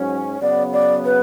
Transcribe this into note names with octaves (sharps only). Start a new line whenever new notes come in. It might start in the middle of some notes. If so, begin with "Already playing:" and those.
Already playing: G#2 F#3 C#4
C#3 F#3 B3 D5
D5
B4